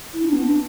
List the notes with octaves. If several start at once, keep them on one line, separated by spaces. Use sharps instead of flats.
E4
D4
B3
D4